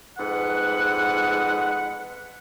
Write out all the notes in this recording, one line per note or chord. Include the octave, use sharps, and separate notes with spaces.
F2 G#2 B4 F#5